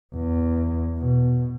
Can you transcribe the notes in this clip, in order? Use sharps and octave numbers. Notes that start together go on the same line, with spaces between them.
E2
B2